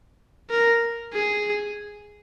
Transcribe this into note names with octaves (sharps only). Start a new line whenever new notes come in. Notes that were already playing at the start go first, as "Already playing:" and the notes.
A#4
G#4